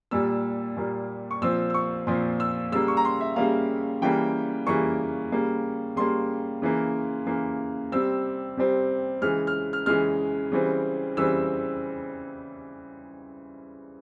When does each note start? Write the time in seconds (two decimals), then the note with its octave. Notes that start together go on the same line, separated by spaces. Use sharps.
0.11 A#2 G3 A#3 E6
0.77 A#2 G3 A#3
1.31 C#6
1.42 A#2 F3 C4 E6
1.70 E6
1.74 C#6
2.07 A#2 F3 C4 C6
2.40 E6
2.72 C#3 G3 A#3 E6
2.88 C#6
2.97 A#5
3.05 C6
3.20 E5
3.36 C#3 G3 A#3 F5
4.02 C#3 E3 G3 A#3 G5
4.67 C#3 E3 G3 A#3 C#6
5.32 C#3 G3 A#3
5.96 C#3 G3 A#3 C6
6.62 C#3 E3 A#3
7.27 C#3 E3 A#3
7.92 C3 G3 C4 E6
8.57 C3 G3 C4
9.22 C#3 E3 G#3 F6
9.47 F6
9.73 F6
9.86 C#3 E3 G#3 F6
10.52 C#3 E3 G3 C4
11.17 C#3 E3 G3 C4 E6